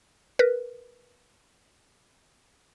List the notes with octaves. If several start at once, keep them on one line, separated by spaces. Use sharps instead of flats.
A#4 B4